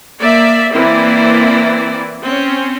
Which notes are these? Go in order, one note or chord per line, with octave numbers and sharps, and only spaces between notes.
A#3 D5 E5
E3 A#3 C4 E4 D5
C4 C#4